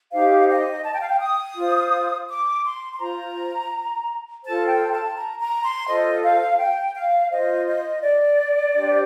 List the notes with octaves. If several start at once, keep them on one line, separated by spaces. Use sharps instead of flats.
D#4 G4 C5 F5
D#5
A5
G5
F5
G5
D#6
F4 C5
D6
C6
C6
F4 C5 A#5
F4 A4 C5 A5
G5
A5
A#5
A#5
C6
F4 A4 C5 D#5
F5
G5
F5
F4 C5 D#5
D#5
D5
D4 G4 C5